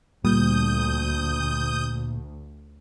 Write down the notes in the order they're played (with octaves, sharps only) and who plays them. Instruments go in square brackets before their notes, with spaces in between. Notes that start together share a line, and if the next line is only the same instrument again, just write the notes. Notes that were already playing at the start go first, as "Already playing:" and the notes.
[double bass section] D2 [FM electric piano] A#2 [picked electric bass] G3 [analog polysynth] D#6 G6